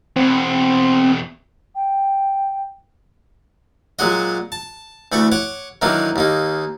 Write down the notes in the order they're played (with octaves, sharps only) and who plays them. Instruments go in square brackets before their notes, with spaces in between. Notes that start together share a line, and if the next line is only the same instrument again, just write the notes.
[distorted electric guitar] E2 B2 [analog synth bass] C4
[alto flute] G5
[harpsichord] A#2 F#3 G#3 F#4 D#5
A5
D2 E3 A3 B5 C#6
C#5 F#5 D6
D#3 E3 F#3 A#3 D4 D#4
D#2 A#3 D#4